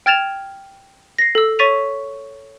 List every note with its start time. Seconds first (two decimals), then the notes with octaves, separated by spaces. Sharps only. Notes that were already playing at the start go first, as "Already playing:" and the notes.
0.06 G5 F6 G#6 A6 E7 F7
1.19 A#6 C7
1.35 A4 E6
1.59 C#5 C#6 A6 B6 D#7 F7